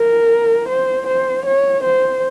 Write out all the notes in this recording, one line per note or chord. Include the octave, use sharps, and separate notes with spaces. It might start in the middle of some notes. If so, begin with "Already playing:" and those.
Already playing: A#4
C5
C5
C#5
C5